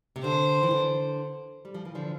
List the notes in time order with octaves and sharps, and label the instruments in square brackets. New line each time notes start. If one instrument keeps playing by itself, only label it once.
[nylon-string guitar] C3
[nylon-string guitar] D3 [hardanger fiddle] C5
[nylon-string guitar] E3
D3
G3
F3
E3
D3 F3